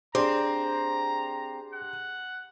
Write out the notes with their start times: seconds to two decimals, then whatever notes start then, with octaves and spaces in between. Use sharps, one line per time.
0.15 C4 D4 G4 G#4 D5 A#5 C6 D6
1.73 F#5